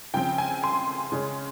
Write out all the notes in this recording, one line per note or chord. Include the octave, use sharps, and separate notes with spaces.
C#3 F3 C4 G5
G#5
C6
C#3 G#3 C#4